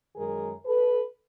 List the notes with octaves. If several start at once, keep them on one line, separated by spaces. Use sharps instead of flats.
F#2 D#3 G#3 G#4 A#4
A4 B4